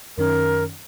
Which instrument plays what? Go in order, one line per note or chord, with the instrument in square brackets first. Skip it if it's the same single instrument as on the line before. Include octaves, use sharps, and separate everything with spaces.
[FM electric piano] F#2 D#3 C#4 [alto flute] A#4